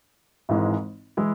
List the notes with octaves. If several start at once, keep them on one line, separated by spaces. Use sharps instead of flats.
G#1 G#2 E3 G#3
E3 G#3 E4